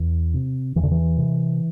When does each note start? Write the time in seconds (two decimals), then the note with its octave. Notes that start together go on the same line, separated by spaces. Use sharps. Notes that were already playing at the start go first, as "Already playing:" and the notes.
Already playing: E2
0.34 C3
0.75 E2 E3
0.83 D3
0.91 E3
1.18 C3